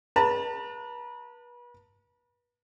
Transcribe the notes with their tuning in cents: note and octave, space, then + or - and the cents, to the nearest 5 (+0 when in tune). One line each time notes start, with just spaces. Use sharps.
B4 -35 A5 +40